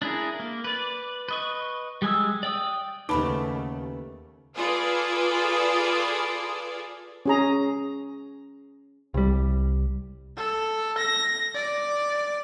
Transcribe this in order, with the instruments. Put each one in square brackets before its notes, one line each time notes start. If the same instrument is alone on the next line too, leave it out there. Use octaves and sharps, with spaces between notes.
[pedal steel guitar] D4 E4 G#4 A#4
A#3
B4 D5
B4 D#5 C#6
G3 G#3 G#5 D#6 E6
D5 G5 D#6
[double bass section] D#2 [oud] C#3 A3 B3 [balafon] D#4 A5 B5
[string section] F4 G#4 A4 B4 D5
[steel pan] C#4 G#4 A#5
[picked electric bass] C2 G3
[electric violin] A4
A#6
D5